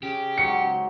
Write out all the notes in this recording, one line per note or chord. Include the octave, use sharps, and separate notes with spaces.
C#3 G4
G#2 F#3 C#5 C#7